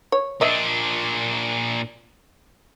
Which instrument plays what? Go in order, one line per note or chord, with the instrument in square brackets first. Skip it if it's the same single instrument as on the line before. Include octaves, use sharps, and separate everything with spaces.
[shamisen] C#5
[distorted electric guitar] A#2 D4 [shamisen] D#5 E5